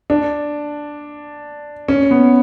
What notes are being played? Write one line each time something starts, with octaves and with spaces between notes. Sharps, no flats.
D4
C#4
B3